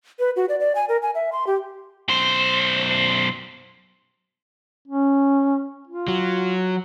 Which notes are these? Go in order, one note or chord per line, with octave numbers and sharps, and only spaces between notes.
B4
F#4
D5
D5
G#5
A#4
G#5
E5
C6
G4
B1 C5
C#4
F4
F#3